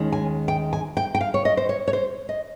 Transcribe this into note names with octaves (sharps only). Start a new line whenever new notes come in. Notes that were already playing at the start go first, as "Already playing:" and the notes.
Already playing: D#2 D#3 G#3 C#4
G#5
G5
G#5
G5
G5
F5
C#5
D#5
C5
C#5
C#5
C5
D#5